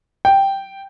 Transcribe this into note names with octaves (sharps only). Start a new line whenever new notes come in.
G5